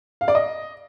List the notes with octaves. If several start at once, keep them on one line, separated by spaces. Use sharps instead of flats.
F5
D5
D#5